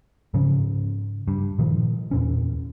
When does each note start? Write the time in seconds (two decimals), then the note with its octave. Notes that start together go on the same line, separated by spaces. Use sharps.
0.34 G#2 C#3 F3 C#4
1.28 G2
1.59 A#2 D#3 F3
2.11 E2 A#2 C#4